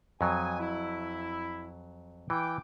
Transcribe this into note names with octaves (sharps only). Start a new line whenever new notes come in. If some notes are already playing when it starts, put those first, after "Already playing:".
F2 F#3 G#5 D#6
E4
E3 G5 D6